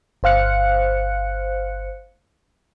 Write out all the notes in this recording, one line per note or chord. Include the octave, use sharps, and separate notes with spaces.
G1 C5 F5 F#6 C#7